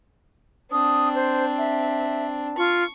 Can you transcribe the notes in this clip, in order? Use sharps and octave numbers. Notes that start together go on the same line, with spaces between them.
C4 D4 D#6
C5
E5
F4 C#6